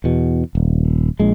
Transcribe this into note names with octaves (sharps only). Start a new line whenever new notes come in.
E2 B2
D#1
A#1 G#3